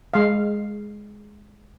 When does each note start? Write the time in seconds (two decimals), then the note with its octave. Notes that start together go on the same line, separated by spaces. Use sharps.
0.14 G#3 F5